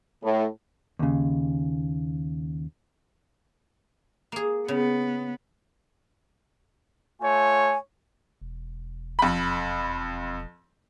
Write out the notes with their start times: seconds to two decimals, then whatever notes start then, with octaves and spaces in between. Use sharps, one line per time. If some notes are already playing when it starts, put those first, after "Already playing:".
0.24 A2
0.99 D#2 C#3
4.32 A#3 G#4
4.68 C#3 B3
7.21 A3 F4 C#5 G#5
8.41 E1
9.19 F2 B5